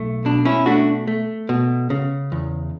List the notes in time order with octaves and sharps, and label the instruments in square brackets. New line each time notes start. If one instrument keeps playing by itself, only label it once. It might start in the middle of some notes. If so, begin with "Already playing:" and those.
Already playing: [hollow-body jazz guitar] B1 A3
B2 D4
C#4 E4
A3 D4 F#4
A3
B2
C#3
E2